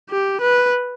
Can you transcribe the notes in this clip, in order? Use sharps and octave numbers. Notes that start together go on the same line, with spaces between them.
G4
B4